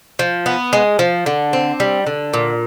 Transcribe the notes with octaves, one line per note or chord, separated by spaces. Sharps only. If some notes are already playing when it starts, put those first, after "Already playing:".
F3
B3
G#3
F3
D3
C4
G3
D3
A#2